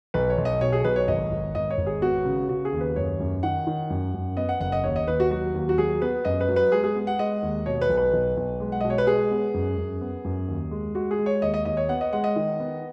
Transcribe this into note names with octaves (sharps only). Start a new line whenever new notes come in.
B1 B4
C#5
B1
D#5
B2 C#5
G#4
B1 B4
C#5
G#1 D#5
G#1
G#1 D#5
C#5
G#1
G#4
B3 F#4
C#3
C#3 F#4
G#4
D#2
B4
F#2 C#5
F#2
D#3 F#5
D#3
F#2
F#2
B3 D#5
F#5
F#1 F#5
D#5
D#2 C#5
D#5
D#2 B4
F#4
F#3 F#4
D#2
F#4
F#3 G#4
B3 B4
F#2 D#5
B4
F#3
B4
G#3 G#4
G#4
B3
F#5
G#3 D#5
D#2
B2 C#5
B4
B1
B4
B1
B1
G#3
F#5
B2 D#5
C#5
B4
G#3 G#4
B3
F#2
F#2
B3
F#2
D#2
G#3
G#3 F#4
G#4
G#3
C#5
D#2 D#5
D#5
D#2 D#5
C#5
B3 F#5
D#5
G#3 F#5
D#5
D#3
B3